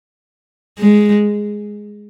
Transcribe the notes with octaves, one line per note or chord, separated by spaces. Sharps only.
G#3